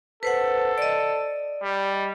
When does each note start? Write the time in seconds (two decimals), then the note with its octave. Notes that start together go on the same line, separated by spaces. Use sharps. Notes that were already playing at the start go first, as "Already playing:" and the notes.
0.23 A4 B4 C5 F#5
0.78 D5 D#5
1.63 G3